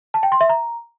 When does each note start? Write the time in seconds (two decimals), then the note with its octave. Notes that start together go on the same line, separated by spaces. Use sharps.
0.14 A5
0.23 G5
0.32 C6
0.41 E5
0.49 A#5